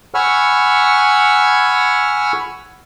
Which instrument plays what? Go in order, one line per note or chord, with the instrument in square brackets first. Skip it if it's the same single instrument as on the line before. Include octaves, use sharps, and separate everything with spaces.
[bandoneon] F#5 G#5 B5 C#6 E6 F6